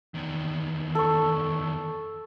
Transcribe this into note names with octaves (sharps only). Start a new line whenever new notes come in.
E2 D#3
A4 C#6